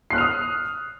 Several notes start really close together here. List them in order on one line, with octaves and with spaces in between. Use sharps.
C7 F#6 F6 F7 D#6